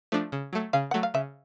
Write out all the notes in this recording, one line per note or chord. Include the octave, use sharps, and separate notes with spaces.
F3 A3 D4
C#3
F#3 A3
C#3 F5
F#3 A3 F#5
F5
C#3 E5